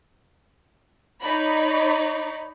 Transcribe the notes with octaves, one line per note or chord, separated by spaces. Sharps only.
D#4 C#5 D5 B5